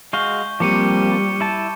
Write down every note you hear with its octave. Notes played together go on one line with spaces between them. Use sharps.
G#3 F#4 F5 C#6 G6 G7
F3 G3 A#3 C4 D6 C#7 D#7
E4 A5